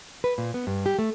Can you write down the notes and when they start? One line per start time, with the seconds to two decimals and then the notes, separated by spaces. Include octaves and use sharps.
0.24 B4
0.38 A#2
0.54 B3
0.67 G2
0.86 G4
0.99 A3